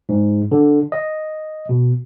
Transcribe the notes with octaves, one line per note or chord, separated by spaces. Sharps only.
G#2
D3
D#5
B2